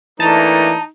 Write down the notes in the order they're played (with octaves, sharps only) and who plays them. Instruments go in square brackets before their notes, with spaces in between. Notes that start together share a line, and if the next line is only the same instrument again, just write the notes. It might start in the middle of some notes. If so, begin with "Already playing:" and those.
[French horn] E3 [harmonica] A3 A#3 D4 [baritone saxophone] D#4 [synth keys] A5 A#5